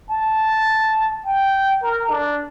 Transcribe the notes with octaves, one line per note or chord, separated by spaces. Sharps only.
A5
G5
A#4
D4